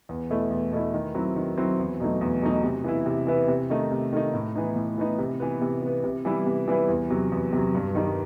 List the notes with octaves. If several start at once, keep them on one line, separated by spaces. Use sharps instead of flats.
E2
B2 A3 E4
E2
B2 A3 E4
D#3
F#3 C4 E4
D#3
F#3 C4 E4
E2
B2 F#3 A3 D#4
E2
B2 F#3 A3 D#4
C3
E3 B3 E4
C3
E3 B3 E4
C3
D#3 A3 D#4
C3
D#3 A3 D#4
A2
E3 B3 D#4
A2
E3 B3 D#4
C3
E3 B3
C3
E3 B3
C3
E3 G3 B3 E4
C3
E3 G3 B3 E4
E2
C3 F#3
E2
C3 F#3
G2
D#3 G3 D#4